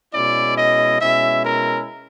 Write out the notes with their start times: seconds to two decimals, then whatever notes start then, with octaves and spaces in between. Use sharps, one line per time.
0.14 B2 G#3 C#4 E4 D5
0.58 D#5
1.01 B2 G#3 C#4 E4 E5
1.45 A#4